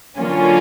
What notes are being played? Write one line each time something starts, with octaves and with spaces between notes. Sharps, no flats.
D3 F#3 A#3 C#4 F4